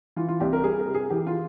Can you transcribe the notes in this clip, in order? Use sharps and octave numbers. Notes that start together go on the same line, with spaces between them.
E3 F4
F4
C2 G4
A#4
G3 G#4
A#4
C3
G#4
E3 G4
F4